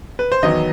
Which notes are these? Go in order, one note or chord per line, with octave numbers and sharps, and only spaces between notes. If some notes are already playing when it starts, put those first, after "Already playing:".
B4
C5
E2 D#3 F#3 B3 D#5